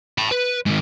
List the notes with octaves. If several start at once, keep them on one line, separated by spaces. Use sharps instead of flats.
A5 B5
B4
G#2 D#3